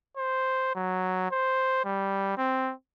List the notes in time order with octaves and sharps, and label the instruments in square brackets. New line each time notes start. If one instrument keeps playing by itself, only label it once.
[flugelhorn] C5
F#3
C5
G3
C4